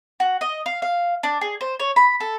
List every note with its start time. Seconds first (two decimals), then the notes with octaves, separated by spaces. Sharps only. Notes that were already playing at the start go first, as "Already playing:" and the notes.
0.20 F#4
0.41 D#5
0.66 F5
0.82 F5
1.23 D4
1.41 G#4
1.61 C5
1.80 C#5
1.96 B5
2.20 A4